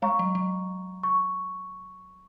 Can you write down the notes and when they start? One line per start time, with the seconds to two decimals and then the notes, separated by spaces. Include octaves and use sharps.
0.02 G#3 C#5 F5 A#5 C#6
0.19 F#3
0.35 F#3
1.03 C#6